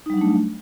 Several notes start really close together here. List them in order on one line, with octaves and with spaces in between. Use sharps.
D#4 G3 F#3 D4 A3